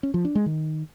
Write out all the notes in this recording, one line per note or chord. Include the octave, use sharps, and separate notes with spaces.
C#4
F3
D4
G#3
D#3